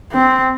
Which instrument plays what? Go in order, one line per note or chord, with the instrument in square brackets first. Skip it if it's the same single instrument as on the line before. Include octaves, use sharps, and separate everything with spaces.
[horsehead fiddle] C4